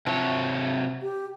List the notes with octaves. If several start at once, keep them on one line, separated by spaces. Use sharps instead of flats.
C3 F3 F#3 C4 C#5
G4